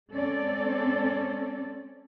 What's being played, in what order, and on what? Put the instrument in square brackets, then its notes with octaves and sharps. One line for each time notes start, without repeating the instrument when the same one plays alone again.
[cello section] G#3 C4 C#4 A4 D5